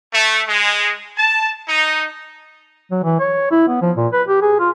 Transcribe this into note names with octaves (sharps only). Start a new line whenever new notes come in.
A3
G#3
A5
D#4
F#3
E3
C#5
E4
B3
F3
A#2
B4
G4
G#4
F4